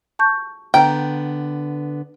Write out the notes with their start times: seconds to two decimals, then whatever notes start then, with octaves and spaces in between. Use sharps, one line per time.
0.19 A5 C#6 G6
0.74 D3 B3 G5 A#5